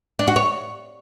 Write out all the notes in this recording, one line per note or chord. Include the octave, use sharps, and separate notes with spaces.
D4
F#4
C#5